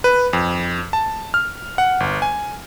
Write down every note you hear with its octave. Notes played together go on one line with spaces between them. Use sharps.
B4
F2
A5
F6
F#5
G1
G#5